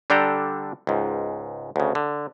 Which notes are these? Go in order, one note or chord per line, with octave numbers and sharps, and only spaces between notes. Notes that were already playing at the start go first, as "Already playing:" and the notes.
D3 G3 D4 A4 G5 A#5
C#2 G#2
D2 C#3
D3